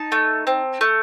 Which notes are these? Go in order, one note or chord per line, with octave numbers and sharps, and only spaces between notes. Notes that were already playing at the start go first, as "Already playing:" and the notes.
Already playing: D#4 A5
A3
C4
A3